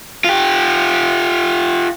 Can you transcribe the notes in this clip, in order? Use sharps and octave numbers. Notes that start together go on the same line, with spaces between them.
F4 G4